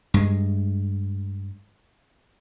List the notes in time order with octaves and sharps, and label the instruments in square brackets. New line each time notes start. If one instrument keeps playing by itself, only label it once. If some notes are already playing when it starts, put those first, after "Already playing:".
[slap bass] G2 G#3